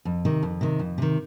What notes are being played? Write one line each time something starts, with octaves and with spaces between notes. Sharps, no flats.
F2
C3 D#3
F2
C3 D#3
F2
C3 D#3